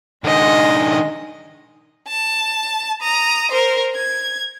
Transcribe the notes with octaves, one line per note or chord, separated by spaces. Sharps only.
D#3 G#3 D4 D#5
A5
A#5 D#6
A#4 C5
G#6